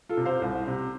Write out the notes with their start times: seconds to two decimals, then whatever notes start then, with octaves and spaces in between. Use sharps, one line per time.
0.09 F4 A4
0.17 C3
0.25 C5 F5
0.42 C2
0.67 C3